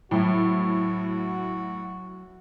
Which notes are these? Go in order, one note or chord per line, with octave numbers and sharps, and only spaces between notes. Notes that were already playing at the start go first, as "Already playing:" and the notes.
A2 F#3 E4 F#4